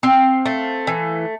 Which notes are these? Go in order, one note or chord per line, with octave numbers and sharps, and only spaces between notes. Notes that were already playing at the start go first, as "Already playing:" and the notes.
C4 F5
A3
E3